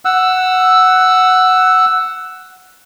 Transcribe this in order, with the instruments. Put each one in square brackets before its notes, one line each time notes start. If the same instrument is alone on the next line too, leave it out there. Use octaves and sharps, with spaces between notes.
[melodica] F#5 E6